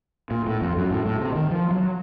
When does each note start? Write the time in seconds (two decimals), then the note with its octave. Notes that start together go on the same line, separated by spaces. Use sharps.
0.31 A#2
0.47 A2
0.61 F2
0.77 F#2
0.91 A2
1.06 A2
1.21 C3
1.35 D#3
1.51 F3
1.71 F#3